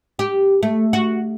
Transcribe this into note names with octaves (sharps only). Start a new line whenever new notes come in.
G4
A3
F#4